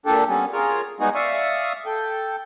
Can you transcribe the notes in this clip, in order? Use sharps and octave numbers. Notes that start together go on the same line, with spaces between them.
A#2 D4 G4 A4
G3 B3 C#4
F4 G#4 A#4 C#5
G3 G#3 B3 D#4 F#4 G#4
D5 E5 F5 C#6 D#6
A4 G5